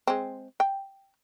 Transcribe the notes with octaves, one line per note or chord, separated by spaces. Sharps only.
G#3 C4
G5